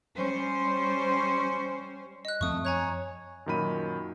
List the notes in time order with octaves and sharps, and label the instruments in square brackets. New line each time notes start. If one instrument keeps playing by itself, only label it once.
[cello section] G3 C#4 C5
[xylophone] D#5 F#6
[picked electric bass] F#2 F3 C4 [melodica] A3 [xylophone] C#6 D#6
[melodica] C#5 [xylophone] G#5 A#5 F#6
[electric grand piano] F#2 A#2 D#3 F#3 B5 D#7